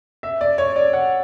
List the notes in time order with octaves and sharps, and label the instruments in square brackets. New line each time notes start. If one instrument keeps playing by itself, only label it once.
[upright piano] E5
D5
C#5
D5
F#5